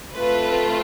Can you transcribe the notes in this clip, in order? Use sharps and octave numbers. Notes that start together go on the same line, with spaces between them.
A3 C4 F4 B4